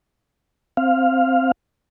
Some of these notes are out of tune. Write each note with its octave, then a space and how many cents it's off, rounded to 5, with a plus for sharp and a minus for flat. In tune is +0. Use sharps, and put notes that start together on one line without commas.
C4 +0 F5 +0